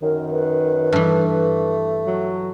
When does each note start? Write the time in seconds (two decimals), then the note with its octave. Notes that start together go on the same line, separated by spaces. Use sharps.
0.02 F#2 D#3 A#4
0.31 B4
0.92 G2 E3 A3
2.07 F#3